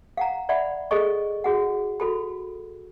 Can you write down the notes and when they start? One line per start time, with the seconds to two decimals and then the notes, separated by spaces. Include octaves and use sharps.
0.17 F5 F#5 A#5
0.49 D5 E5 F#5 B5
0.91 G#4 A4 D#5 C#6
1.44 F#4 G#4 F#5
2.00 F#4 A4 B5